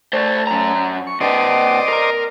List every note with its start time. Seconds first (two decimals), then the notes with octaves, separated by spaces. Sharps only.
0.13 A3 C5 D5
0.47 F#2 A#5
1.07 C#6
1.21 C3 B4 C5 D5 D#5
1.88 A#4 A#5